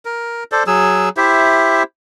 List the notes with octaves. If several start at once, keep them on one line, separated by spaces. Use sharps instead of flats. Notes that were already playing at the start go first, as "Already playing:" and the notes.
A#4
A4 C5 D5
F#3 G#4 E6
E4 G4 C5 E5